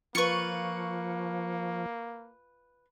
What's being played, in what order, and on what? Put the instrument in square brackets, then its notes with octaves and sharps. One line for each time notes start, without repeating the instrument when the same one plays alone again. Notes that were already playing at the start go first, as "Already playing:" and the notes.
[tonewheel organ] F3 [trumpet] A#3 [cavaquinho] F4 B4 [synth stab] C#6 C#7